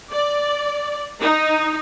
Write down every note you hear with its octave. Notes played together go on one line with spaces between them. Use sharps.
D5
D#4